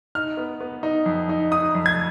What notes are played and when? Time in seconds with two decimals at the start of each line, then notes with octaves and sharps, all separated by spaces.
0.15 D#4 F6
0.37 B3
0.61 B3
0.83 D#4
1.06 F2
1.29 D#4
1.51 D#4 D#6
1.75 F2
1.86 G#6